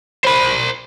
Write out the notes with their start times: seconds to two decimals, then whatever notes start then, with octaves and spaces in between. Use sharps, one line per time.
0.25 C5 B5